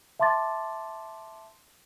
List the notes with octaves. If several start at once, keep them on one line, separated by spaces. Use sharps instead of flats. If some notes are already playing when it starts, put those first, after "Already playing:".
E5 A5 C6 D6 A6